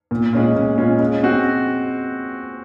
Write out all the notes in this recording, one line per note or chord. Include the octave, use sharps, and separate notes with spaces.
A#2
G#3 C#4 F4
A#2
G#3 C#4 F4
G#3
C4 F#4